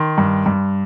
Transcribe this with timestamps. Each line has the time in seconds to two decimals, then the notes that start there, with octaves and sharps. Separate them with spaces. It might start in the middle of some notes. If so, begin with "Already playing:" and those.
Already playing: D#3 C6
0.18 G2
0.46 G2